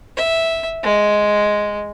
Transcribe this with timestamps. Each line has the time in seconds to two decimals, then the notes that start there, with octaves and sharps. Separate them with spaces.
0.17 E5
0.83 G#3